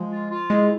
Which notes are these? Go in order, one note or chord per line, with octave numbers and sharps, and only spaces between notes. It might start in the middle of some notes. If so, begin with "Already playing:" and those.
Already playing: F3 G#3
F4
F4
G#3 E4